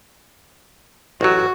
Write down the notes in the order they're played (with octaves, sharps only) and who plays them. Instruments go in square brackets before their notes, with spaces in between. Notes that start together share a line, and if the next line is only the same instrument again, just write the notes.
[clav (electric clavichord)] A1 F#3 [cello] F#4